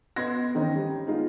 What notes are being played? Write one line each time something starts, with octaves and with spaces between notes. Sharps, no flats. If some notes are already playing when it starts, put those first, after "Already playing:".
B3 D#5 C6 G#6 A#6
D#3 C4 C#4 D#4
G3
G#3 B3 D#4 F4